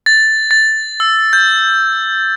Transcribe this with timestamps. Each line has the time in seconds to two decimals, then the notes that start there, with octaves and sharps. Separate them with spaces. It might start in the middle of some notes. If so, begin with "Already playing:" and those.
0.06 A6
0.51 A6
1.00 E6
1.33 G6